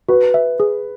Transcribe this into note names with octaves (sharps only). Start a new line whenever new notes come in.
F#4 B4
E5
G#4